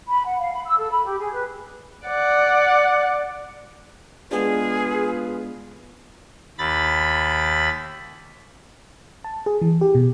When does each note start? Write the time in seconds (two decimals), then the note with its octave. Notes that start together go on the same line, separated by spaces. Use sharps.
0.07 B5
0.24 F#5
0.39 F5
0.53 B5
0.65 E6
0.77 A4
0.91 B5
1.04 G4
1.18 G#4
1.31 B4
2.07 D5 F#5
4.31 G#3 B3 D4 F4 G#4 B4
6.58 D#2 B5 A6
9.24 A5
9.46 G#4
9.62 E3
9.81 G4
9.95 B2